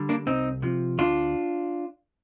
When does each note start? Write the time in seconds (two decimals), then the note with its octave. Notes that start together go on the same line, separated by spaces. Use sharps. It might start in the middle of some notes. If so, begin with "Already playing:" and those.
Already playing: D3 G3
0.09 A#3 D4
0.27 C2 C4 D#4
0.62 C3 F3
0.98 D2 D4 F4